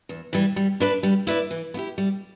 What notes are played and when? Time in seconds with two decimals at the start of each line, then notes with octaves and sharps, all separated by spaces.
0.09 E2
0.33 E3 G3
0.56 G3
0.80 D4 B4 D5
1.03 G3
1.27 E4 B4 D5
1.51 E3
1.74 B3
1.77 E4 G4
1.98 G3